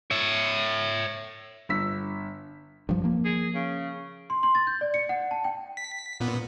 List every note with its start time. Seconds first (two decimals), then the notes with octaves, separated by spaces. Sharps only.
0.11 C#5 E5
1.69 G1 E6 B6
2.89 G2 F3
3.04 F3 A#3
3.25 G#4
3.55 C#3
4.30 C6
4.43 C6
4.55 A6
4.67 G6
4.81 D5
4.94 C#7
5.09 F#5
5.31 A5
5.44 G5
5.77 B6
6.20 A#2 B3